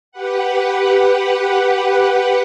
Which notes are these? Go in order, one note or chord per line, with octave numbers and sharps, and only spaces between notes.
G4 B4 F#5